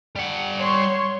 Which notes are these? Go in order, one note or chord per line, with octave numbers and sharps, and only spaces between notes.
G3 F#5
C#5 C6